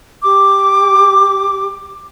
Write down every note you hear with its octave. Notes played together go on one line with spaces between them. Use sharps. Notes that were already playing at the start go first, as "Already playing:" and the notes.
G4 D6